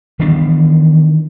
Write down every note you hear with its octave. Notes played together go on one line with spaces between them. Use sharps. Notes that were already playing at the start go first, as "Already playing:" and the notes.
D#3 E3 B3 D4